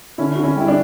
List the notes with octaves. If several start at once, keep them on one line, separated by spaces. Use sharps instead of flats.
D3 C#4 E4
D3 F#4
C#4 E4
G3 E4
D4